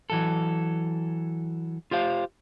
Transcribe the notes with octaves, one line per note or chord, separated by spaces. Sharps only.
E3 F#3 A4
F4 G4 C5 F5